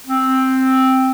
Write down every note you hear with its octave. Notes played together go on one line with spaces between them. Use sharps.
C4